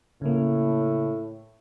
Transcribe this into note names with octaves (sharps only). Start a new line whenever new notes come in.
A2 C#3 A#3